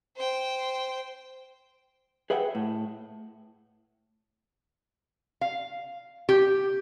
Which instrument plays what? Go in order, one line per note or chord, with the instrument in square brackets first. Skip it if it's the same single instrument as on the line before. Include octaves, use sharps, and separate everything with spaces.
[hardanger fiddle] C5 G5
[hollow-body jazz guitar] G#4 B4 E5 F#5 G5
A2
[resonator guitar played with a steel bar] F5
G4